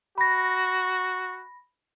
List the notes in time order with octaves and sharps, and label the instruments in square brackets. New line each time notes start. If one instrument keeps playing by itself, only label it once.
[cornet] F#4 [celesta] B5 A#6